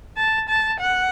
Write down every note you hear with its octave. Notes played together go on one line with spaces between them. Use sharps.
A5
A5
F#5